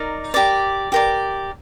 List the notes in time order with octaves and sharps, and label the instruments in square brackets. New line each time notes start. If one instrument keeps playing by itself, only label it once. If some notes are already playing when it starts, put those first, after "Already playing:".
Already playing: [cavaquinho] D#4 A#4 D5
G4 A#4 D5
G4 A#4 D5